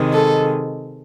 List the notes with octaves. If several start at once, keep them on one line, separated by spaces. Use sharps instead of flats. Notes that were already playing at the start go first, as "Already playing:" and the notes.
Already playing: C3 D#3 G#3
A4